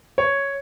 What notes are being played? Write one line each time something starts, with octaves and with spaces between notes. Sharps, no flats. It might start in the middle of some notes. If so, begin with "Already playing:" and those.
C#5